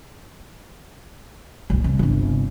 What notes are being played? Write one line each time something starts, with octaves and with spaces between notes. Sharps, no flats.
B1 A#2
C2
G1 C3